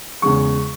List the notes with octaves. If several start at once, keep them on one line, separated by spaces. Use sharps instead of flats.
E2 C#3 G#3 C#6